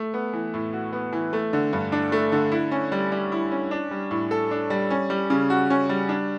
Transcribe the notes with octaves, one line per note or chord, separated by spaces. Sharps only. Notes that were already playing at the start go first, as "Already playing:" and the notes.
Already playing: A3
B3
E3
A2
F#4
B3
E3
A3
D3
G2
D4
A3
D3
E4
C#4
G3
G3
E4
C#4
D4
G3
A2
A4
D4
G3
C#4
G3
C#3
F#4
C#4
G3
D4